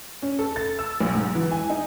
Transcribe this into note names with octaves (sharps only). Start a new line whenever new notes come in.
C#4
A4
A6
E6
B1
G#2
E3
G#5
D#4